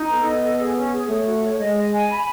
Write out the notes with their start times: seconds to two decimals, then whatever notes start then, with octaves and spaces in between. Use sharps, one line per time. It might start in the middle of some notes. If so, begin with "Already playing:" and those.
Already playing: D#4
0.10 B3 A4
0.26 D#5
0.43 A4
0.59 G#4
0.76 C#4
0.93 G#4
1.09 A3 C#5
1.26 F#4
1.43 C#5
1.59 G#3 D#5
1.77 D#5
1.93 G#5
2.09 B5